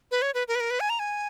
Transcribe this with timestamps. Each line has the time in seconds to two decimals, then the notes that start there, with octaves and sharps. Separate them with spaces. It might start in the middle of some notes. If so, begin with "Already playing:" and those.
0.11 B4
0.22 C#5
0.34 B4
0.48 A#4
0.55 B4
0.60 A#4
0.70 B4
0.80 G#5
0.90 A#5
0.99 G#5